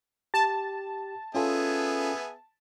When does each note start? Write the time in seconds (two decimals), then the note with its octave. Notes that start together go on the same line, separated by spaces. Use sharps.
0.34 G4 A5
1.35 B3 C#4 F4 G#4 A4 E5